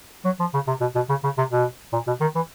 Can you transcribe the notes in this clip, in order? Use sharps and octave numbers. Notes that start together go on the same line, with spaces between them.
F#3
F3
C#3
C3
B2
B2
C#3
C#3
C3
B2
A#2
B2
D#3
E3